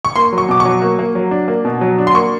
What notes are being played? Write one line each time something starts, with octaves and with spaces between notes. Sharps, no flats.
C#6
A#3 C6
F#3
C#6
B2 D6
C#6
F#3
A#3
A#3
F#3
D4
A#3
B2
F#3
D4
C6
A#3 C#6